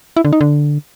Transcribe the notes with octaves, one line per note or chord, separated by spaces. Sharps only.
E4
D3
D#4
D3